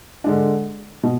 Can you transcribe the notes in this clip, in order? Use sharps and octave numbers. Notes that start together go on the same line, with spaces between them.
D3 G#3 D4
B2